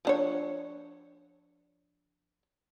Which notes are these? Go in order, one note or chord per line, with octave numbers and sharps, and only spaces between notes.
F3 D4 C#5